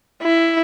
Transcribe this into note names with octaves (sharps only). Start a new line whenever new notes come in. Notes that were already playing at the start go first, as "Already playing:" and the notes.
E4